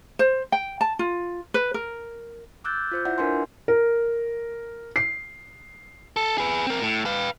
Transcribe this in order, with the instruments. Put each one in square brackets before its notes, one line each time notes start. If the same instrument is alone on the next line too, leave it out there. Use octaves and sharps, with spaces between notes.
[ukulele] C5
G5
A5
F4
B4
A#4
[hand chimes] D6 E6 F#6 G6 A6
F4 C5 G6
E4 F4 D5 E5 F#5
D4 A#4 B4 E5 G#5 C6
[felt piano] A#4
C7
[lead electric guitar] A4
G#4 B4
C4 A#4
A2
B4 F5